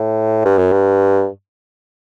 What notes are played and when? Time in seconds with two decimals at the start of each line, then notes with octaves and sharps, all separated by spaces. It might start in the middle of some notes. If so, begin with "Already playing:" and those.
Already playing: A2
0.45 G2
0.58 F#2
0.72 G2